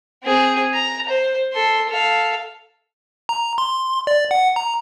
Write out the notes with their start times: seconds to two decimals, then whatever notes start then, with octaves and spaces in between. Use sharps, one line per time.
0.24 C4 G#4
0.74 A#5
1.09 C5
1.54 A4 C6
1.89 A4 F5
3.29 A#5
3.58 C6
4.07 D5
4.31 F#5
4.56 A#5